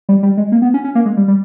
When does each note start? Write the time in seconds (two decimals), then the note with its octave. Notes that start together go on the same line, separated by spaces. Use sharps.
0.09 G3
0.23 G3
0.37 G#3
0.52 A#3
0.62 B3
0.74 C#4
0.84 C#4
0.95 A#3
1.06 G#3
1.17 G3
1.28 G3